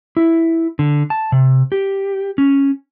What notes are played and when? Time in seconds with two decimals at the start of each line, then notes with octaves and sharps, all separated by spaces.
0.17 E4
0.79 D3
1.10 A5
1.32 C3
1.72 G4
2.38 C#4